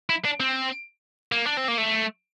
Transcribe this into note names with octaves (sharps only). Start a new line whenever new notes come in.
E4
D4
C4
A#3
D4
C4
A#3
A3